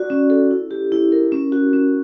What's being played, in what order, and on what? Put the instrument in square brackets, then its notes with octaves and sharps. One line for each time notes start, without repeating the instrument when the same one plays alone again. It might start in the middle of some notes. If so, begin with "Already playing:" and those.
Already playing: [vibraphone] F#4 D5
C#4
A4
E4
G4
E4
A#4
C#4
F#4
C#4